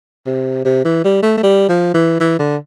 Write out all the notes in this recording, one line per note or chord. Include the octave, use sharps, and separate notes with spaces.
C3
C3
E3
G3
A3
A3
G3
F3
E3
E3
D3